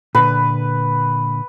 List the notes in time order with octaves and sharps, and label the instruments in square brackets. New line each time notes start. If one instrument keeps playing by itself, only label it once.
[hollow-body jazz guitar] A#2 D3 [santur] B4